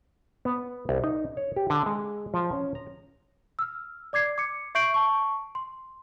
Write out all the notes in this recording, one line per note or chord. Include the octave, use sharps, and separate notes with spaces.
B3
C2
D#4
C#5
G4
D3
G#3
F3
C#4
A#5
E6 F6
D5 D6 G#6 C7
D6 C#7
E5 C#6 G6 C7 D7 F#7
A5 C#6
C6